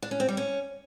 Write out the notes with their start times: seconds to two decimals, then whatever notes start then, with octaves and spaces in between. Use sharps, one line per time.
0.02 D4
0.11 C#4
0.20 C4
0.29 G3
0.37 C#4